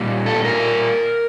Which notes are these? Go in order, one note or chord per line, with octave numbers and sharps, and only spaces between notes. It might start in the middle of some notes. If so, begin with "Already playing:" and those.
Already playing: A#2 G3
A4
A#4